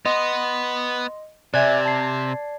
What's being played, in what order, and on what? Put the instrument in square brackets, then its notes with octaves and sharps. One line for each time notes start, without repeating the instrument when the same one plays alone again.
[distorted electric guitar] B3 [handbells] D#5 [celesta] C6
[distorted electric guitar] C3 [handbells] D5 G#6 [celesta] E5 G#5 F#6
[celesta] A5 C7